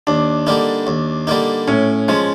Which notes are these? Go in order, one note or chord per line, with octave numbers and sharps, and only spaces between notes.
D#2 D4
D3 G3 A#3 D#4
D#2
D3 G3 A#3 D#4
A2 C#4
F3 G#3 C#4